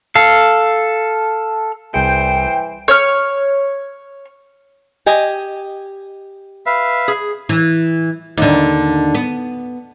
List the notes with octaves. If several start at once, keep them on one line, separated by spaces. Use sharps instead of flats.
A4 F5
C2 E3 G#4 C5 G5 D7
C#5 F6
G4 D#5 G#5
B4 E5 F5
G#4
E3
D#2 D3
B3